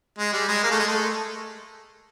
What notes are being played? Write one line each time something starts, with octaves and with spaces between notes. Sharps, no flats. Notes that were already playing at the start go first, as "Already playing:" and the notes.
G#3
G3
G#3
A#3
A3
G#3
A3